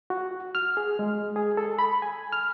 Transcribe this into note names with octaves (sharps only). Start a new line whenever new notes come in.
F#4
F6
G#4
G#3
G#4
A4
B5
G#5
F6